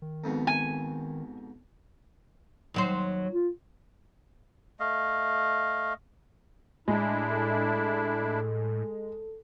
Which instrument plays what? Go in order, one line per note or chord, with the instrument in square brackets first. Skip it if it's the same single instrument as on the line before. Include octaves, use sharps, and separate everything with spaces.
[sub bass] D#3
[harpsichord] F2 G#2 B2
[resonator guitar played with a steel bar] G#5
[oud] D#2 F#3 C5
[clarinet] F4
[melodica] A3 D#5 F5
[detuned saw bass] A2 [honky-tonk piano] G#3 [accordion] D4 E4
[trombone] A4